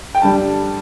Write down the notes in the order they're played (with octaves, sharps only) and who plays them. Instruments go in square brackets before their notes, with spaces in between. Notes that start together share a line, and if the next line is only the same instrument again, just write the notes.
[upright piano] G5
G2 D3 G3 A5